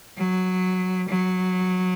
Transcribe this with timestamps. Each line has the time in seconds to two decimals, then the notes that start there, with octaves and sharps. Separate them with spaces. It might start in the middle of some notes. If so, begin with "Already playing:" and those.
0.18 F#3
1.09 F#3